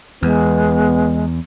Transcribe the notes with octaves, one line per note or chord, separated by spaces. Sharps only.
E2 G#3 B3